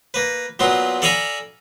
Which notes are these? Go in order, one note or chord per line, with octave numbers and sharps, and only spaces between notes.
A#3 B4
A#2 F#3 B3 F4
A4 D5 F5 G#5 A#5 B5